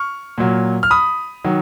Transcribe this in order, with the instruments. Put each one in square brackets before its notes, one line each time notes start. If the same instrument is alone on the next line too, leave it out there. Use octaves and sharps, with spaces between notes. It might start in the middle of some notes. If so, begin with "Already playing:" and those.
Already playing: [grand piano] C#6 F6
A#2 F#3
F6
B5 D#6
D#3 F#3